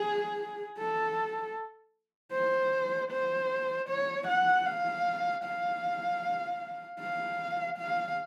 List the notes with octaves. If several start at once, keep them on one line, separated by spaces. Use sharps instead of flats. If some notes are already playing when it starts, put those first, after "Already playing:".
Already playing: G#4
A4
C5
C5
C#5
F#5
F5
F5
F5
F5